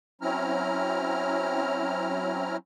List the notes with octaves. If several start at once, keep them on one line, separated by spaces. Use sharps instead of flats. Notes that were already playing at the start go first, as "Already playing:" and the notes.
F#3 C4 C#4 E4 A#5 F6